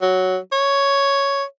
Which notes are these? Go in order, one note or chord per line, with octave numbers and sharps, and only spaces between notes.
F#3
C#5